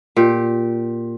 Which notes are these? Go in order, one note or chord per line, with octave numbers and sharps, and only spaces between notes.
A#2 G4